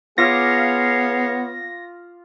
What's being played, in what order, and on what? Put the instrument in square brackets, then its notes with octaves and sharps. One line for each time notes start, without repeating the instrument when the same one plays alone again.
[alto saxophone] B3 [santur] F4 D6 D#6 [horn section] G#4 C#5 F5 [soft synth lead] A#6